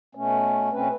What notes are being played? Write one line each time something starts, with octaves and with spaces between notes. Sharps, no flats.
B2 A3 C#4
B2 A3 C4 C#4 B4